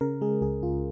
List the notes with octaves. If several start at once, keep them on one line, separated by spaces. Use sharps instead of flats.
C#3 A#4
G#3 G#4
C#2 G#4
C#2 F4